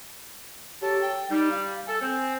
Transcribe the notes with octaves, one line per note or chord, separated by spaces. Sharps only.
F#3 G4 A4 A5
G5
G3 D#4
F5
A4 G#5
C4 G#5